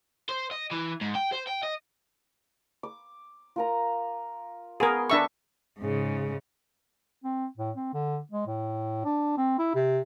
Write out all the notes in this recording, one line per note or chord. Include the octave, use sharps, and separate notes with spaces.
C5
D#5
E3
G#2
G5
C5
G5
D#5
D6
F4 A#4 A#5
B3 G#4 A#4 C6 C#6
D4 B4 E5 G5 C#6 D#6
G#2 C#3
C4
A2
C4
D3
G#3
A2
D4
C4
E4
C3